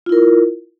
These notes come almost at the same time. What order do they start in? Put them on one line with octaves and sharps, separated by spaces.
F4 E4 A#4